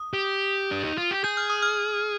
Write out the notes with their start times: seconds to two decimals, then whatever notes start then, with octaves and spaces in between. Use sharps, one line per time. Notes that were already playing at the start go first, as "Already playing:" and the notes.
Already playing: D#6
0.13 G4
0.71 D4
0.84 D#4
0.98 F4
1.11 G4
1.24 G#4 G6
1.37 F6
1.50 D#6
1.62 F6